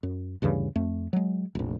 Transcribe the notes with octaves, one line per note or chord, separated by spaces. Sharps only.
F#2
D2 G2 C#3 E3
F2 A3
F#3 G#3
F1 A#1